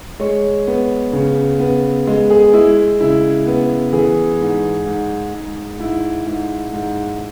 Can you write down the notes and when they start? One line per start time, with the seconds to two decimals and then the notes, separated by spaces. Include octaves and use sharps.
0.20 G#3 C#5
0.67 B3
1.13 C#3
1.59 B3
2.07 G#3
2.30 G#4
2.53 G#3 E4
3.00 C#3 E4
3.47 B3
3.93 E3 G#4
4.40 G#2
4.86 G#2
5.34 G#2
5.79 G#2 E4
6.27 G#2
6.73 G#2